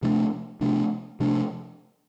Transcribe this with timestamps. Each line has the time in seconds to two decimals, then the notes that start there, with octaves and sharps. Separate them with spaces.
0.02 C3 F3 A3 D4
0.61 C3 F3 A3 D4
1.20 C3 F3 A3 D4